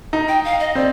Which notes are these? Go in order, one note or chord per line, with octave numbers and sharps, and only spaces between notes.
D#4
G5
F5
D#5
C4 D5